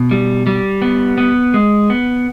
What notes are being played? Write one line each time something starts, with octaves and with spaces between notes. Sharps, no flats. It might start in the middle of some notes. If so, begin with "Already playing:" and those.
Already playing: B2
G3
G3
B3
B3
G#3
B3